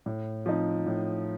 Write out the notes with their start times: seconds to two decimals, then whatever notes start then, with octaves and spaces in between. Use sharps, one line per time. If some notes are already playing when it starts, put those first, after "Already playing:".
0.06 A2
0.46 F3 C4 D#4
0.87 A2